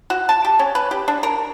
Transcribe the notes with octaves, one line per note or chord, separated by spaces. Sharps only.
F#4
A5
G4
C#4
B4
G4
D4
A#4